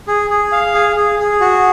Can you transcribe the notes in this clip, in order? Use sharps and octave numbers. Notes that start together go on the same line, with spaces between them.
G#4
G#4
F5
G#4
G#4
G#4
F#4